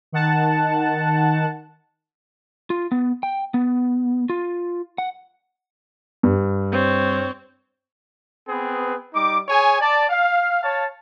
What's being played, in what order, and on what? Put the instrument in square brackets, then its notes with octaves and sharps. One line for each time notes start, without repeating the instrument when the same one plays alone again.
[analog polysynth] D#3 F#5 A5
[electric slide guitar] F4
B3
G5
B3
F4
F#5
[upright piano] G2
[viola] C4 C#5
[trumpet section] B3 C4 G#4 B4
G3 D#4 D6
G#4 C#5 G#5
D5 A5
F5
C#5 F5 A5